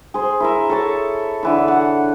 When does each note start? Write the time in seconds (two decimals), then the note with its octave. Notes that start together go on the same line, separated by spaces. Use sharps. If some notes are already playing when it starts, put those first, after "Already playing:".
0.14 G#4 C5
0.40 E4 A#4 E5
0.69 A4 C#5 A5
1.43 D3 E3 E4
1.68 F#5